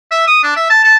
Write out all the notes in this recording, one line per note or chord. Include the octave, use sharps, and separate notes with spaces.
E5
D#6
D4
E5
A5
A5